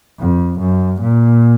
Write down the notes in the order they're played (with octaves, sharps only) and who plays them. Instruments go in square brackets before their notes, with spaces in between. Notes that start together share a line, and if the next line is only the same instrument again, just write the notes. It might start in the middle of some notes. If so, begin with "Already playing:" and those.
[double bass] F2
F#2
A#2